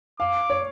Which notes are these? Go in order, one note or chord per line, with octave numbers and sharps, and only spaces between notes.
F5 D6
C#5